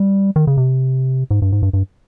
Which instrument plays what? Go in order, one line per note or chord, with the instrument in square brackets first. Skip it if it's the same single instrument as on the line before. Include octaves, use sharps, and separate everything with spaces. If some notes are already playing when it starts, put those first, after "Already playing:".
Already playing: [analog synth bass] G3
D#3
C#3
C3
G#2
G2
G#2
G2
G2